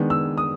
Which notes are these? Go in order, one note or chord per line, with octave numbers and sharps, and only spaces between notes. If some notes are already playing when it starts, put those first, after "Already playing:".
Already playing: D#3 G#3 B3 D4
E6
D#6